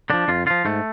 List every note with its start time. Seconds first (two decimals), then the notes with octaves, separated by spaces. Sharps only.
0.10 D3 F3 D4
0.28 F2 F4
0.46 D3 F3 F4
0.65 G#2 A3